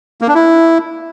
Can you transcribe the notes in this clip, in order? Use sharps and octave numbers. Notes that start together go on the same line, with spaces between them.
A#3
D4
E4